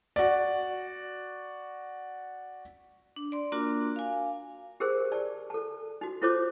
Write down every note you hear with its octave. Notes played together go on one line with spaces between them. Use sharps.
F#4 D5
D4
D5 C6
A#3 D4 F4 F#4 A#4 D6
F5 G#5
G4 G#4 A#4 C5
D5 A5
A4 A5
D#4 F#4
E4 F4 A4 C5 C#5 D6